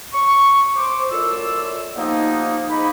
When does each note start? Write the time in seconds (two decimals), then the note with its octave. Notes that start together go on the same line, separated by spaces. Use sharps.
0.13 C#6
0.76 C5 D6
1.11 F#2 A2 F4 D5 E6
1.96 F3 G3 A#3 B3 D#4
2.69 G#2 A#3 D#4 B5